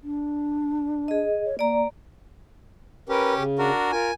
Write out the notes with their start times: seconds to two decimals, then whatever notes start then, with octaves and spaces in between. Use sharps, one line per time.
0.03 D4
1.08 G#4 D#5
1.45 C#5
1.59 A#3 D5 A#5
3.09 C#4 G4 A#4 B4
3.36 C#3
3.59 D4 F#4 A#4
3.92 F4 A#4 G#5